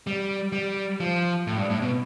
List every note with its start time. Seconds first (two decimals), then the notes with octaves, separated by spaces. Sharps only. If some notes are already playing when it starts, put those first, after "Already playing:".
0.07 G3
0.52 G3
1.00 F3
1.47 A2
1.58 G2
1.70 A2
1.82 B2